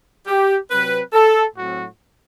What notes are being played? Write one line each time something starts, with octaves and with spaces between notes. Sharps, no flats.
G4
C3 F#3 C4 B4
A4
A2 F#3 C4 F#4